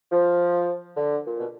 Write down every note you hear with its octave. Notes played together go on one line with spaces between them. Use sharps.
F3
D3
A#2
B2